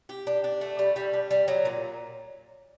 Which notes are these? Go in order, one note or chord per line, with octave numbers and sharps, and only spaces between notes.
G4
D4
D4
A3
G3
G3
D4
G3
F#3
A#2